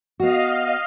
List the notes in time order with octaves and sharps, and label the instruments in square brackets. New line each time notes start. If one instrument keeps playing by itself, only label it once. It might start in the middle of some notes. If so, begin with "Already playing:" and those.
[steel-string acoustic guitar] B3 F#4 [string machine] D#5 F5 F6